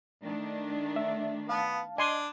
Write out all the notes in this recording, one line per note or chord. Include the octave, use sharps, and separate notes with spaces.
D#3 A3 D4
E5
B3 F5 A5
D4 D#5 G#5 C6